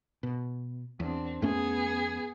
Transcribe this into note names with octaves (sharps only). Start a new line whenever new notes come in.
B2
E2 C4 D4
F2 A3 B3 C#4 G#4